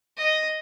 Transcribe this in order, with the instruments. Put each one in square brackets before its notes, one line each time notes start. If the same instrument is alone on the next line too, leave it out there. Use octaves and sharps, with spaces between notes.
[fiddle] D#5